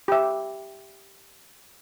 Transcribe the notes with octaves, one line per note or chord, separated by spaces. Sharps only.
G4 E5